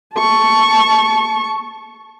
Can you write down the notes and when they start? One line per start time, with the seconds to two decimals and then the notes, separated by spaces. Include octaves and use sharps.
0.16 A5 C#6